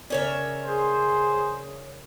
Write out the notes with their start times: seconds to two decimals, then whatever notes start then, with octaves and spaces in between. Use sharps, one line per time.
0.10 C#3 C#4 A#4 C#5 D5 E5
0.65 G#4 C5